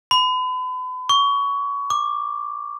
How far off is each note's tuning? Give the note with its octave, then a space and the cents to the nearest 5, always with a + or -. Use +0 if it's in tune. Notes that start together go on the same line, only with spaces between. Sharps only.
B5 +40
C#6 +25
D6 +10